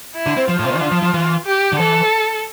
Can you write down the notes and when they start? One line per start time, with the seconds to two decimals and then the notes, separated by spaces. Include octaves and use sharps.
0.16 E4
0.26 D3
0.37 C4
0.48 F3 F4
0.59 A2
0.65 C3
0.70 A#2
0.76 E3
0.81 D3
0.91 F3
1.02 F3
1.14 E3
1.46 G4
1.73 D3
1.79 E3 A4